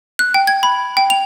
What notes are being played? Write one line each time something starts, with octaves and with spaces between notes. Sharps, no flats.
F#6
G5
G#6
B5
G5
F7